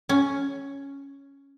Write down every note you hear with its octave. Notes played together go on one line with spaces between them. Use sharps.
C#4